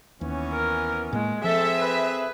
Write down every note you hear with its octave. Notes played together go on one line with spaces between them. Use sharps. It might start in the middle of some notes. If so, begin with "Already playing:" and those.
D#2 E3 B3 C#4
A#4
A2 G#3 A#3
F3 C4 G#4 A4 E5
B4